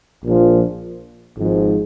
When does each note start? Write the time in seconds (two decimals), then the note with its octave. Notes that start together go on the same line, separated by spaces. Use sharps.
0.24 A#1 A#2 F3
1.39 G#1 G#2 F3